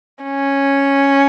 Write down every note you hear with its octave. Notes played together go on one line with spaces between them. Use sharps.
C#4